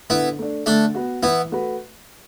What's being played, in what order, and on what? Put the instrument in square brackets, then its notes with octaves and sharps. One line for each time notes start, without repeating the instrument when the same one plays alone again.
[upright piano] D3 [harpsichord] B3 E4
[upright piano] A3 D4
[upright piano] D3 [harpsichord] A3 D4
[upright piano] B3 F#4
[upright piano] E3 [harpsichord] B3 E4
[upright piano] A3 F#4 B4